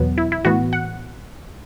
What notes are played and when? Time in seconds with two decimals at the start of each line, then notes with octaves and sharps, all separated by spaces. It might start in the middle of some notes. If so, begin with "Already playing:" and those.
Already playing: E2 B2 F#3 B3
0.18 E4
0.32 E4
0.45 A2 E3 B3 F#4
0.73 F#5